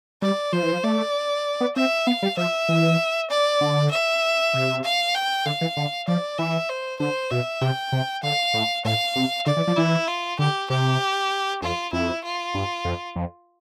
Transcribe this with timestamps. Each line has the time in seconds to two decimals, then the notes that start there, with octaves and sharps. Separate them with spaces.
0.22 G3 D5
0.53 F3 C5
0.63 E3
0.72 F3
0.84 A3 D5
1.61 B3
1.76 C4 E5
2.07 B3 F5
2.22 G3
2.37 F3 E5
2.69 E3
3.30 D5
3.61 D3
3.92 E5
4.54 C3
4.84 F5
5.15 G5
5.46 D3 F5
5.61 E3
5.77 D3
6.08 F3 D5
6.38 E3 E5
6.69 C5
7.00 D3 C5
7.30 B2 E5
7.61 C3 G5
7.92 C3
8.23 D3 F5
8.54 A2
8.85 A2 F5
9.16 C3
9.46 D3 D5
9.57 E3
9.67 F3
9.77 E3 E4
10.08 F4
10.39 D3 G4
10.70 C3 G4
11.62 F2 F4
11.93 F2 E4
12.24 F4
12.54 G2
12.85 F2
13.16 F2